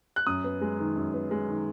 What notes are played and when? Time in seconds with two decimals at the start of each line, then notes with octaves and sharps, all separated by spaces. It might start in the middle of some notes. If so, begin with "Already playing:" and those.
0.16 F#6
0.26 F#2 D#6
0.44 B3
0.61 G#3
0.79 D#3
0.96 F#2
1.14 B3
1.31 G#3
1.48 D#3